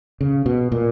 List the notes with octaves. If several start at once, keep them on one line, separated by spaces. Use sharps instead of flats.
C#3
B2
A#2